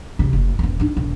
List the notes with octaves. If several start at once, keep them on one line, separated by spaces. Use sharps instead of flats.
E1 C3
F#1
E1 B3
D4 D#4
E1